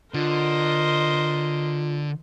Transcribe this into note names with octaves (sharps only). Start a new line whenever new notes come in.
D3 F4 A#4 C5 D#5